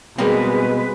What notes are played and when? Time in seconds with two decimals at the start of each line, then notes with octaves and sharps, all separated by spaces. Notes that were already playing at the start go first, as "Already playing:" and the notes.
0.18 B2 G3 G#3 A#3 C4 B4